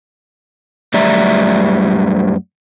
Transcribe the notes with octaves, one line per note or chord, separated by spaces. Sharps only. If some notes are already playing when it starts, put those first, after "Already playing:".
F#2 G3 A3 D5 E5 A#5